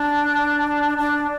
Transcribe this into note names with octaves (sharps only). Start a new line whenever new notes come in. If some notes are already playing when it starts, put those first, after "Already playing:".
Already playing: D4
D4